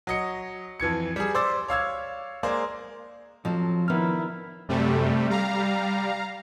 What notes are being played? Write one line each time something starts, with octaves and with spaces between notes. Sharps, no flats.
F#3 D#5 C#7
F2 E3 G#6 C#7
G3 G#4
C5 D5 D6 E6 A6
C#5 F5 E6 G#6
G#3 A#3 G#4 C5 D5
F2 F3 F#3 A4
D#3 B3 D4 E4 F6
F#2 C3 G3 A3
G3 F5 A#5